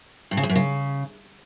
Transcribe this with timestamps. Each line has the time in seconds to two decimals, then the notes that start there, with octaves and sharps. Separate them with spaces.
0.31 G2
0.37 C#3
0.43 E2
0.49 F#2
0.56 C#3